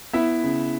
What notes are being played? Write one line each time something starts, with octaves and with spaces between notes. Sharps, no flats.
B3 E4 E5
C#3